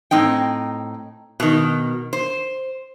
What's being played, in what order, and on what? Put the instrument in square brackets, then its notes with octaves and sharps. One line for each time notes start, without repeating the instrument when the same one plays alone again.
[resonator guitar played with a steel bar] A2 C4 D#4 G5
B2 D#3
C5